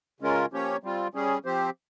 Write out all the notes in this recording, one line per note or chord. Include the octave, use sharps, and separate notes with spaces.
C#3 G#3 C#4 F4 A#4
F3 A#3 C#4 G4 C#5
G3 C4 F4
G3 C#4 G#4
F3 C4 G4 C5